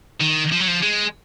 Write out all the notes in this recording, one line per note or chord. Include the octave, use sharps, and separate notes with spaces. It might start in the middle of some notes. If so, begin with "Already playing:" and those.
D#3
F3
F#3
F3
G#3